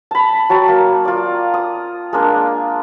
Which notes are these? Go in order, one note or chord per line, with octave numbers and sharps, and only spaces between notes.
A5 B5
F#3 G5 A5 C#6
A#3
F4 D5
D#6
G#3 A#3 D4